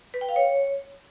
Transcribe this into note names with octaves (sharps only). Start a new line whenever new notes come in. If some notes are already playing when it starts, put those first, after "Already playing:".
B4
G5
F5
C#5